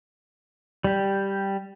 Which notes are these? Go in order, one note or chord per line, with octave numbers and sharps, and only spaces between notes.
G3 G4